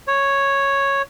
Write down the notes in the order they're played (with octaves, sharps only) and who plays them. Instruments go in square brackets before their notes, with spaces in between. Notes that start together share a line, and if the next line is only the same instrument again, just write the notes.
[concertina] C#5